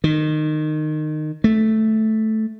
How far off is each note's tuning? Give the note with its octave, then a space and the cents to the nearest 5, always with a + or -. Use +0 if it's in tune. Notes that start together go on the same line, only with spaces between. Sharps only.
D#3 -20
A3 -5